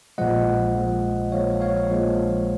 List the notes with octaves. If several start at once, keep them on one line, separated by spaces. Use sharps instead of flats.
A#1 A#2 F3 G#3 D#5 F#5
A#1 A#2 F3 G#3
A#1 A#2 F3 G#3 C#5 F5
C#5 F5
A#1 A#2 F3 G#3